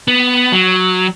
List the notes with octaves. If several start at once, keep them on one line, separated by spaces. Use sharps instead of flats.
B3
F#3